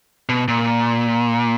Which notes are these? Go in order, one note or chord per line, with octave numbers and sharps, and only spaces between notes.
B2
A#2